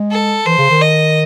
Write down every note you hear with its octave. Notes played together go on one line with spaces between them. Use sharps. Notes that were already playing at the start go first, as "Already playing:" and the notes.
Already playing: G#3
A4
E3 C5
C#3
D#3
D#5